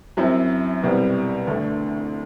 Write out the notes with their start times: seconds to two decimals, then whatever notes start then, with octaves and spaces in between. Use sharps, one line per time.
0.17 F#2 F#3 C4 E4
0.83 C2 B2 G3 C4
1.47 D2 D3 A3